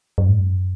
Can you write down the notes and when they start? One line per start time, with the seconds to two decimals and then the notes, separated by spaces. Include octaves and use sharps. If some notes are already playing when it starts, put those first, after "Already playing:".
0.18 F#2
0.28 G#2
0.39 F#2